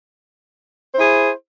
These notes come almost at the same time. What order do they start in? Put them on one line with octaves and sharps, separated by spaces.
C5 E4 G#4